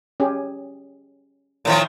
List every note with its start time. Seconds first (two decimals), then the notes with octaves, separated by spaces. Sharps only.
0.20 C#4 G4 G#4
1.65 A2 D#3 F3